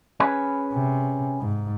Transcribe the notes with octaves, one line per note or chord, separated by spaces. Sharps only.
C#4 G#4 B4
C3
G#2